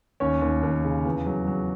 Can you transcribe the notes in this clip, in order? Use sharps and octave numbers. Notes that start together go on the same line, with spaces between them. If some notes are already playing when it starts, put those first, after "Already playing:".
D#2 C#4 C#5
D#2
D#2
C#3
E2
F#3
F#3